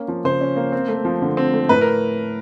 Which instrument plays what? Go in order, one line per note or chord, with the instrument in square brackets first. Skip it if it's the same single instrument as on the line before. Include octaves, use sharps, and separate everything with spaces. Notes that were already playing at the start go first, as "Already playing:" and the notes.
Already playing: [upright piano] A#3 C#4
F3
C#3 C5
C#4
A#3
C4
A3
F3
D3
C4
A3
A2 B4
A#4